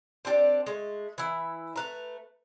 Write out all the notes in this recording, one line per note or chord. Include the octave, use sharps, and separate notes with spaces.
C4 D4 G4 D5
G#3 A3
E3 E4
A3 B4 A#5